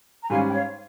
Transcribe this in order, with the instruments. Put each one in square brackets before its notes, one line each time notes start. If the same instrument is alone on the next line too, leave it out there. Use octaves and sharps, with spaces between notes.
[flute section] A#5
[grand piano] G#2 G3 C#4 [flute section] F5 G#5
[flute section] G5
C#5 F5